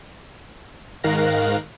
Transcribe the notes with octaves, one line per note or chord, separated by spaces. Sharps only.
G#2 D#3 A#4 F5 F#6 A#6